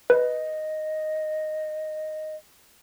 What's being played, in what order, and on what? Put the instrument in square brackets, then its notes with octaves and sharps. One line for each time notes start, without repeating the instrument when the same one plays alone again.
[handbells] B4 [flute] D#5